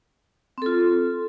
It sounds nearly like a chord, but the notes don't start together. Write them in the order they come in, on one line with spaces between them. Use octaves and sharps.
C4 A4 F4